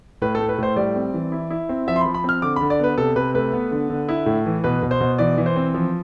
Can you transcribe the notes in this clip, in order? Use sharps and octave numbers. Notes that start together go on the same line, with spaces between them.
A2 B4
A3 A4
B4
A2 C5
G3 D5
C4
E3
E4
E4
C4
F3 E5
C6
B5
F3
B5
C4 F6
D3 D6
D3 B5
D5
B3 B4
C3 A4
C3 B4
A3 B4
B3
D3
D3
E4
A2
E3
B2 B4
B2
C5
B2
E3 D5
E3
C5
C4
F3